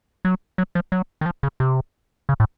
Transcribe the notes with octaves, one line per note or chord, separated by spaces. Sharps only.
F#3
F#3
F3
F#3
D#3
F3
C#3
C3
C#3
A2